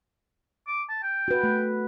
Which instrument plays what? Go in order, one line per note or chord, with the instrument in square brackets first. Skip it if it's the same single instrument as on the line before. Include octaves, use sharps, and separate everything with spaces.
[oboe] D6
A5
G5
[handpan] F#4 B4
A3